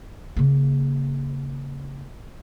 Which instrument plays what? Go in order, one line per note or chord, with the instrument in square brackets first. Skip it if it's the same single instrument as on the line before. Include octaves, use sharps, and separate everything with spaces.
[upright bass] C#3 A#3